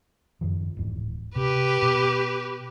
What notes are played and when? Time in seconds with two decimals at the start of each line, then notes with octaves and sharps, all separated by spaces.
0.41 F#2 D#3 F3
0.77 D1 G#2 E3
1.36 C3 G4 B4
1.82 B2